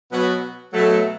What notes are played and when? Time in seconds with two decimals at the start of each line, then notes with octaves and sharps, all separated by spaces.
0.11 B2 F#3 B3 F#4
0.74 B2 F#3 A3